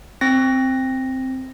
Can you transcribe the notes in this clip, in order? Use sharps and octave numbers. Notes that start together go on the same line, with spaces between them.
C4 A#6